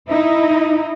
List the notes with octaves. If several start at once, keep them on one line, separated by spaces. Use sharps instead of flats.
D#4 E4